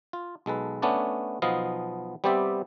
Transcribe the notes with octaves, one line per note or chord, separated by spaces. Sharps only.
F4
B1 G#3 A4 B4
A3 B3 C#4 D4 D5
B1 F3 B3 D#5 F5
G3 B3 C4 G4 D5 E5